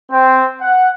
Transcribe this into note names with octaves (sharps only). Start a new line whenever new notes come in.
C4
F#5